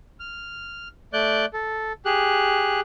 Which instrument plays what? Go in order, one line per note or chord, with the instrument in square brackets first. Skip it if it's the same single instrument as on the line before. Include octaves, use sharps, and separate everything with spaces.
[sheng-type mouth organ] F6
A3 D5 F#6 G6
A4
G4 G#4 F#6